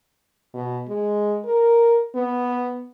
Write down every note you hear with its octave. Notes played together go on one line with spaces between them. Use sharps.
B2
G#3
A#4
B3